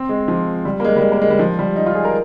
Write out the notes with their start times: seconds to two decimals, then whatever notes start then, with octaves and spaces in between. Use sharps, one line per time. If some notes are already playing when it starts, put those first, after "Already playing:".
Already playing: C4
0.09 G#3
0.28 F3
0.65 G3
0.80 A#3
0.85 G#3
0.96 G3
1.02 G#3
1.12 A#3
1.22 G#3
1.30 G3
1.39 F3
1.59 G3
1.76 D#4
1.86 F4
1.95 G#4
2.05 A#4